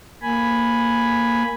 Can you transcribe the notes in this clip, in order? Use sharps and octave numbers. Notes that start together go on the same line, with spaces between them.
A#3 G#5 B5